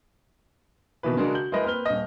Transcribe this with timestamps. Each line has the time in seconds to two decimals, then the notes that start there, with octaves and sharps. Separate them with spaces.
1.03 B2 D#3 E3 B4
1.16 C#3 G#3 D4 F#4 A#4
1.34 F#4 G6 F#7
1.52 G#3 E4 A#4 B4 D#5
1.64 A#3 C4 B4 F6 G7
1.85 D#1 D#5